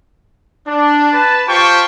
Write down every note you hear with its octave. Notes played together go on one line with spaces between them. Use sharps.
D4
B4 A5
F4 G4 C5 G5 A5 C#6